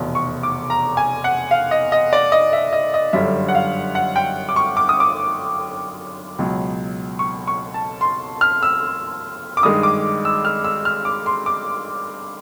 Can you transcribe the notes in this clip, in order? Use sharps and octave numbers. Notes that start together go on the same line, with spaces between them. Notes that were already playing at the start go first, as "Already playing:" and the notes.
Already playing: F1 E2 B2
C#6
D6
A#5
G#5
F#5
F5
D#5
D#5
D5
D#5
E5
D#5
D#5
G1 F#2 D3 G3 E5
F#5
F5
F#5
G5
D6
C#6
D6
D#6
D6
C#2 B2 F#3
C#6
C#6
A5
C6
F6
E6
D6
G2 D#3 G#3 D#6
D6
E6
F6
E6
F6
D6
C6
D6